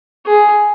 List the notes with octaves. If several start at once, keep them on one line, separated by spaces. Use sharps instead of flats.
G#4